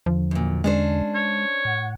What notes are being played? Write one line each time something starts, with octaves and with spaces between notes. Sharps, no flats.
E2 D3 F3
F#2 A#2
G#3 C#4 D4 C5
C#5
A2 F#5